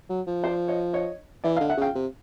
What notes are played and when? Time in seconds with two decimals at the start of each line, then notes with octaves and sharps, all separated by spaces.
0.10 F#3
0.27 F3
0.44 C5 D5
0.68 C#5 D#5
0.93 C#5 D#5
1.44 E3 D5 E5
1.56 D#5 F5
1.60 D3
1.70 E5 F#5
1.77 C#3 F5 G5
1.95 C3